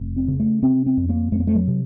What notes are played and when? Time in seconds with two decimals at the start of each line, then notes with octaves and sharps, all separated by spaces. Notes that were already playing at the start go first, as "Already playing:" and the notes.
Already playing: F1
0.16 C4
0.28 C#3
0.40 A3
0.62 C3 C4
0.86 C4
0.97 F2
1.09 A#3
1.32 F2 A3
1.40 A#3
1.47 A3
1.55 F#3
1.67 C3